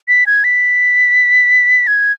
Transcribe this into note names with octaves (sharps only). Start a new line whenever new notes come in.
B6
G#6
B6
G#6